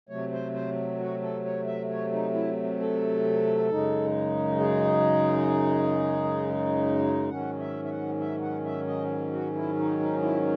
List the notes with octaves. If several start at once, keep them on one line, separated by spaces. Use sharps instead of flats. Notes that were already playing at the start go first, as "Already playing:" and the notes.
C3 F#3 A3 C#5
C5
C5
F#4
A4
C#5
E5
C#5
D#4
E4
A4
F#2 C#3 G#3 D#4
G#4
G#2 D#3 F#3 C#4 F#5
E5
E5
F#5
E5
F#5
E5
D#5
F#4
E4
D#4
D#4
E4